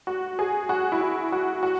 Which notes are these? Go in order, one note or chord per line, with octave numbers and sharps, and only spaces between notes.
F#4
G#4
F#4
E4
F#4
F#4
F#4